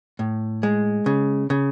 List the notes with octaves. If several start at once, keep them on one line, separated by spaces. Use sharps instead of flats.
A2
G#3
C#3
C#3